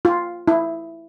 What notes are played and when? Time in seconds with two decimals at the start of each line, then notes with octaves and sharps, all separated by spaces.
0.05 F4
0.48 E4